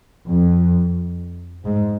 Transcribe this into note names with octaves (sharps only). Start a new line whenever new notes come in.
F2
G#2